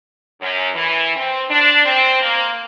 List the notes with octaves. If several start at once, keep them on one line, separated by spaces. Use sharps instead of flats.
F#2
E3
C4
D4
C4
A#3